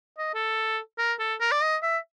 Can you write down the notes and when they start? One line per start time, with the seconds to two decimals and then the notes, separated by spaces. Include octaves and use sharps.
0.18 D#5
0.34 A4
0.98 A#4
1.19 A4
1.41 A#4
1.52 D5
1.62 D#5
1.83 E5